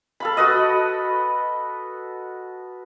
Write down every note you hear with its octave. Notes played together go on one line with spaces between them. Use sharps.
A4 F5 B5
F#4 B4 D#5